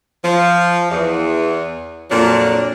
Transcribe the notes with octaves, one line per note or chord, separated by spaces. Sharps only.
F3
E2
F2 A#2 F#3 D4